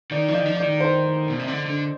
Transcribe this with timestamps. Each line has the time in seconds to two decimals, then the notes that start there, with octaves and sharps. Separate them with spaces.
0.11 D#3 D5
0.28 F3 D5
0.33 D#5
0.39 D#3
0.46 F3
0.56 D5
0.62 D#3
0.80 C5
1.30 B2
1.39 C3
1.48 D3
1.66 D3